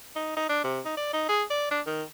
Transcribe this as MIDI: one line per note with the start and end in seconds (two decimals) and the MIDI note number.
0.16 0.33 63
0.36 0.48 63
0.49 0.63 62
0.64 0.80 48
0.85 0.96 63
0.97 1.08 74
1.13 1.25 63
1.29 1.43 68
1.50 1.67 74
1.71 1.81 62
1.86 2.03 51